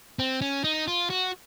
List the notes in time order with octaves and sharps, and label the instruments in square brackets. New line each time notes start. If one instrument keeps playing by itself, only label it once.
[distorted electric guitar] C4
C#4
D#4
F4
F#4